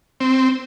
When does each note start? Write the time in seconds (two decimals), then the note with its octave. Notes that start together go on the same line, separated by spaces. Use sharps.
0.20 C4